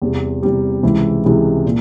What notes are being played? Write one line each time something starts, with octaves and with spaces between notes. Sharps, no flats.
E2 C3 G3
E2 C3 G3
C#2 C3 E3 G#3 E4
C#2 C3 E3 G#3 E4
A#2